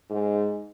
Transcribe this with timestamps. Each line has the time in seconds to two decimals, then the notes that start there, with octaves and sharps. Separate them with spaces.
0.10 G#2